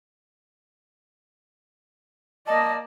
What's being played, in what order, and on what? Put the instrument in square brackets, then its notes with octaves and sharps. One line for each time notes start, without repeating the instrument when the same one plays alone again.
[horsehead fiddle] A#3 D5 [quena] D#5 [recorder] A5